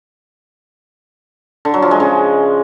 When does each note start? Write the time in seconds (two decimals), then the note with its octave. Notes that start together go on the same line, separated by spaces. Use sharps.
1.65 D3
1.74 F#3
1.82 F3
1.91 G#3
2.00 C#3